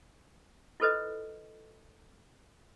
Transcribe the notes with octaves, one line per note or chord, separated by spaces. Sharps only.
E4 F4 A4 B4 C5 D#5